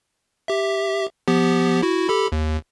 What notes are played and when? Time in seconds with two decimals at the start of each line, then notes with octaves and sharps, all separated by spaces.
0.48 G4 E5
1.28 F3 B3 G4
1.82 E4 F#4
2.09 G4 A4 B5
2.32 D#2